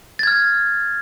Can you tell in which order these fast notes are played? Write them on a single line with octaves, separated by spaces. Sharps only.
A6 G#6 F6